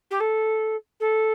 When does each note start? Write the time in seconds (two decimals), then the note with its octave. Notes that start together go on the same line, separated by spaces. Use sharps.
0.11 G4
0.20 A4
1.00 A4